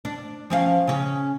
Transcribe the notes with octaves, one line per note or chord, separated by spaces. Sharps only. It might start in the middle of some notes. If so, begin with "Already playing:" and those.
D4
F3 C#4 F5
C#3 C#4